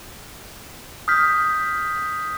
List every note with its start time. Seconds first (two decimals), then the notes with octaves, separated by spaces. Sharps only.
1.08 D#6 F6 G6 B6